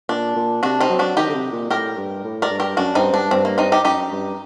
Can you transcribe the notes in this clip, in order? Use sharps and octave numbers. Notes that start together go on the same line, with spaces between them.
A#2 D4
A#2
C3 D4 F#4
C4 D#4
F#3
D4 F#4
D#3 D#4 G4
D3
C3
A#2
A2 G4 A#4
G2
A2
A#4 D5
G2
G4 A#4
F#2 D4 F#4
G2 C4 D#4
G2 D4
G2 C4
A#3
C4 D#4
D#4 G4
F#2 D#4 G4
G2